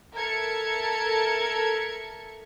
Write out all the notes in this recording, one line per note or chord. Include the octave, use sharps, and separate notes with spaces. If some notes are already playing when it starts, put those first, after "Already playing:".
A4 A#4 E5 A5 G#6 C#7